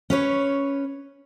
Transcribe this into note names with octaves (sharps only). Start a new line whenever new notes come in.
C#4 B4 C#5